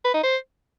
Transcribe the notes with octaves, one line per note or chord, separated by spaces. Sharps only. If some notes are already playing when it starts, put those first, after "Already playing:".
B4
D#4
C5